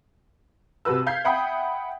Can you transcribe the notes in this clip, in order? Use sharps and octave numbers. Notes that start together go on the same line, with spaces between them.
C2 C3 F#4 B4 E6
F5 G6 G#6 B6 C7
E5 F#5 G5 B5 D#6